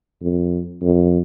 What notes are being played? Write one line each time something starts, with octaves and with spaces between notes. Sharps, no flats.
F2
F2